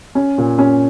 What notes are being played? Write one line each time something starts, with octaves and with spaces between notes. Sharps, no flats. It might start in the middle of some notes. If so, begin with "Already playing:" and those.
C#4
A#2
C#4